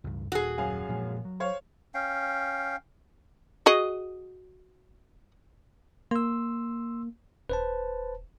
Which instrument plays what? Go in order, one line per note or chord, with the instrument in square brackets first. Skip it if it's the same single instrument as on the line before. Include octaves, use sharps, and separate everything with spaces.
[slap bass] C#2 G2
[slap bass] D#1 [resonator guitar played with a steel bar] F#4 G#4
[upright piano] F#2 F5 G#5
[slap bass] A#2 F3 G#3
F#3
[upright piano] C5 C#5 F5
[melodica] C#4 F5 G5
[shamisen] F#4 G#4 D#5
[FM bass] A#3 [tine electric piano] C6 E6
[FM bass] D#1 [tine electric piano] B4 C5 A5